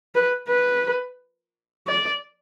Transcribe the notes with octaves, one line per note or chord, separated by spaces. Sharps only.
B4
B4
D5